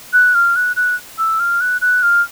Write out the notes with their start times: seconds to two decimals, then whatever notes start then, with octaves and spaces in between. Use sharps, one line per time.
0.13 F#6
0.34 F6
0.56 F#6
0.76 F#6
1.18 E6
1.40 F6
1.61 F#6
1.81 F#6
2.03 F6